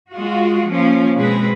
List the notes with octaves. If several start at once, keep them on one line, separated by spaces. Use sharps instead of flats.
G#3 F4 F#4
F3 A#3 C#4
B2 G#3 C4 G#4 B4